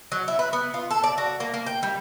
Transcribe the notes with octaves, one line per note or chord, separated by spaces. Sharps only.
F#3
E4
B4
B3
F4
A4
D5
F#4
A#3
A#3
G5
G3